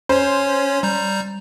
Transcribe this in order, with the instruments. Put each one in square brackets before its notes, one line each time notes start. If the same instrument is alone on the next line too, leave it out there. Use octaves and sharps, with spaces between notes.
[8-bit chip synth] C#4 C#5 [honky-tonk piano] C5
[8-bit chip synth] G3 A#5 G6